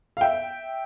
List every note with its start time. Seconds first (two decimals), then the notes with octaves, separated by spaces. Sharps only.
0.17 F5
0.21 E5 G5